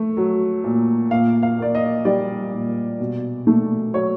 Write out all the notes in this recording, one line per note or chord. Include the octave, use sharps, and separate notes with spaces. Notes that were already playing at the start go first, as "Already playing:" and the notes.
Already playing: A3
F#3
A#2
A#2 F5
F5
A#3 D5
D#5
G3 D5
A#2
B2
A3
F#3 C#5